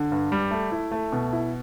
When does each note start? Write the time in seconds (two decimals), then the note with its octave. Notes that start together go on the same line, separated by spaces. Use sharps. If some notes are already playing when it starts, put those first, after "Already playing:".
Already playing: D3
0.12 G2
0.32 G3
0.51 A3
0.72 E4
0.92 A3
1.12 B2
1.33 E4